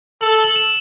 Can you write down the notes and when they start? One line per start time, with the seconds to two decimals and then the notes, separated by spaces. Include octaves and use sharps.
0.21 A4 F#7
0.32 G7
0.44 F#7
0.56 E7